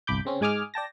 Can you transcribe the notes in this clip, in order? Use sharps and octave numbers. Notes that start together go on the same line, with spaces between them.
G1 C2 B5 D6 G6
C#3 C4 C#4
G#2 G#3 G#5 D6 D#6 F6
D5 G5 A5 A#6